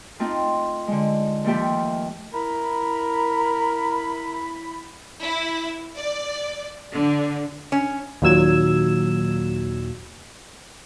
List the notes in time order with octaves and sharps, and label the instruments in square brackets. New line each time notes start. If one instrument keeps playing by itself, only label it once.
[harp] A3 C4 D#4 F4
D3 G#3
D#2 F3 A3 G4 E5
[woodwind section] E4 B5 [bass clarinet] A#4
[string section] E4
D5
D3
[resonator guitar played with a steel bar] C#4
[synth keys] D#2 A#2 F#3 E6 G#6 E7